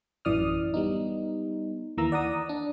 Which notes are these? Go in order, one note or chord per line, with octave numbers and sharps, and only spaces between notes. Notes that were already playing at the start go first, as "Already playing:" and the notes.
A1 F#2 E3 D5 D#6 F6
G3 B3 D#4
D#2 E3 A#3 A#5 E6
D5 F#5 A#5 D#6
D4